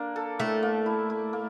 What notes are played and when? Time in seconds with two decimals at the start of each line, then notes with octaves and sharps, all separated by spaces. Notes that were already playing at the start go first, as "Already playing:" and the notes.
Already playing: A#3 D4
0.16 A4
0.39 A2 A3
0.63 A#3
0.86 E4
1.10 E4
1.33 A#3